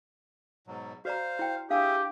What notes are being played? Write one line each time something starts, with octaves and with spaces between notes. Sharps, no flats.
G#2 B2 F#3
F#4 C5 D5 F5 A#5
E4 G5
D4 G4 G#4 E5 F5 D#6